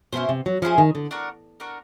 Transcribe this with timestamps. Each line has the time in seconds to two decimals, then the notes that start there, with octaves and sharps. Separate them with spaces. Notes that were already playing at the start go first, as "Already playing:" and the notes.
0.12 B2 C#4 E4 G#4 C5
0.29 C3
0.46 F#3
0.62 F3 C#4 E4 G#4 C5
0.78 D#3
0.95 D3
1.11 D4 F#4 A#4
1.60 D4 F#4 A#4